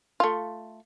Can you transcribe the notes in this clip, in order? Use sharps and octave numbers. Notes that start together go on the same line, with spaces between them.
A3 F4